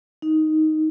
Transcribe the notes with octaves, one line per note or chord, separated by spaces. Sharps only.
D#4